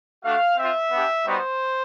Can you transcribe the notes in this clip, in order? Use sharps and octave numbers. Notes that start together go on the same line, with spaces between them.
A3 D4 F#4 F5
C4 F4 E5
B3 D4 G4
G3 B3 D#4 F#4 C5